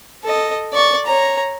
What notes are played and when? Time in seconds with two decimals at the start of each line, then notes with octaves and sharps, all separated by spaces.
0.24 A4 D#5
0.73 D5 C#6
1.06 C#5 A#5